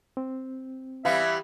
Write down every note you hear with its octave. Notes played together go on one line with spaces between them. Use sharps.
C4
E3 G3 B3 E5 F5